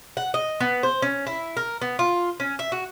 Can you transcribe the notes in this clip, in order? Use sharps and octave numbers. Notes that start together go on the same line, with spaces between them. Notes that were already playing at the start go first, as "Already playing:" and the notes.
F#5
D#5
B3
C5
C#4
E4
A#4
B3
F4
C#4
E5
F#4